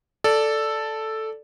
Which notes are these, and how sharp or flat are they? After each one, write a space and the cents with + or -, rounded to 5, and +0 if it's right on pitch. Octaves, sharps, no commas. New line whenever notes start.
A4 +0 D5 +0